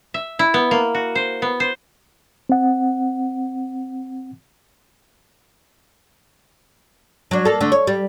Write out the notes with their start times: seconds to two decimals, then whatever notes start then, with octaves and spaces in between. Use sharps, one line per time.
0.14 E5
0.39 E4
0.54 B3
0.71 A#3
0.95 F#4
1.15 C5
1.42 B3
1.60 C5
2.49 C4 F#5
7.31 F#3 D4
7.45 A#3 A4
7.61 D3 A3
7.72 C#5
7.87 G3